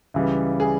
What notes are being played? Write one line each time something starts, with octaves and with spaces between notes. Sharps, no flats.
C#2 C#3 E3 G3
G#4